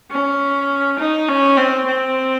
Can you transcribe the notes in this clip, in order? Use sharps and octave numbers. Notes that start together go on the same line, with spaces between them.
C#4
D#4
C#4
C4
C4